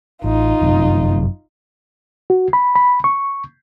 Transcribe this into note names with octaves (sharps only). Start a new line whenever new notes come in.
A1 D#4 F4
G1 F#2 C3
F#4
B5
B5
C#6